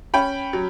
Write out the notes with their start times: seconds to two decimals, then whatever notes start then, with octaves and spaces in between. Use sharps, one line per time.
0.14 C#4 G5 B5
0.53 F#3